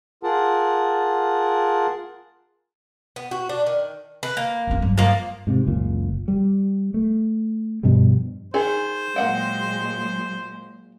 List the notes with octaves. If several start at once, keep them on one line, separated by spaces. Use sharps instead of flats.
F4 G#4 A#4 F#5 A5
B3
F#4
D4
D#3
B4
A#3
F2 D#4
G2 F#3
F3 A#3
G#2 C3
F#1 C#2 A#2
G3
A3
G2 B2 F3 G3
D#3 G#4 C5
A#2 F#3 G#3 A#3 F#5 G5